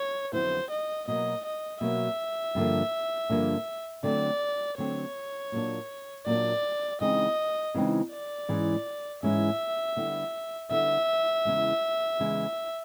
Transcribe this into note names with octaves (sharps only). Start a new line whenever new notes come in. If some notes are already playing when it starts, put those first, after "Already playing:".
Already playing: C#5
F2 D3 F#3 B3 E4 C5
D#5
B2 F#3 A#3 D#5
D#5
B2 F#3 A#3 E5
G2 D3 F3 A#3 D4
G2 D3 F3 A#3 D4
D3 F#3 A3 C4 D5
D3 F#3 A3 C4 C#5
A#2 F#3 A#3 D4
A#2 F#3 A#3 D4 D5
C#3 E3 G#3 C4 D#4 D#5
C#3 E3 G#3 C4 D#4
D5
G#2 E3 G#3 C#4
G#2 E3 G#3 C#4 E5
D3 G3 B3 E4
D3 G3 B3 E4 E5
E2 C#3 E3 G#3
E2 C#3 E3 G#3